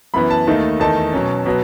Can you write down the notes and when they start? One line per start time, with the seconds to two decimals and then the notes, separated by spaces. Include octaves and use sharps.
0.14 F#2 E3 B3 B5
0.31 A5
0.47 D#2 D#3 A3 D#4
0.80 E2 D#3 A3 D#4 A5
1.13 B2 F#3 C#4
1.46 B2 F#3 B3